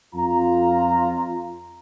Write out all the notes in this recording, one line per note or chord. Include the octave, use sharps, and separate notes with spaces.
F2 F4 A#5